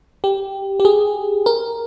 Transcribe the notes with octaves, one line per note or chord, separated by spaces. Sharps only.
G4
G4
G#4
A#4